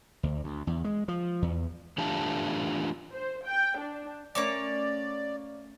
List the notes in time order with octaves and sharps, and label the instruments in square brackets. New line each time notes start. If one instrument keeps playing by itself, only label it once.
[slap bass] D2
D2
E2
G#3
F3
E2
[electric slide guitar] E3 A3 D4 F4 G4 A5
[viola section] C5
G5
D4
[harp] A3 C#4 [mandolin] A#3 C#5 D6 [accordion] D5